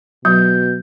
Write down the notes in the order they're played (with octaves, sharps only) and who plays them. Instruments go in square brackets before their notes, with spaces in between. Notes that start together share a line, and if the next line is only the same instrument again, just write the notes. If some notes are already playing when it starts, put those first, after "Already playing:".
[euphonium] B2 [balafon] F#3 [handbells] G6